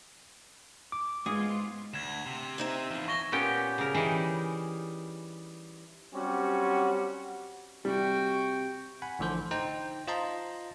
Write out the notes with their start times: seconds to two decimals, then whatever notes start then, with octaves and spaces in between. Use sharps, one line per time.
0.92 D6
1.26 G#2 G#3 B3 F4 G#4
1.94 D2 G#6 E7
2.26 C3
2.58 C4 D#4 E5
2.90 E2 F3
3.08 C#6 A#6 G7
3.32 A#2 B3 C#4 G4 G5
3.78 C#3 A#4
3.94 E3 G3 D#4 G#4
6.14 F#3 G3 C4 C#4 F#4 G4
7.85 C3 G3 F#4 G5
9.02 F#5 G#5 B5
9.19 A1 A2 D3 F3 C5 G6
9.51 D#4 C5 G5 A#5
10.07 F4 C5 D#5 A5 A#5 C6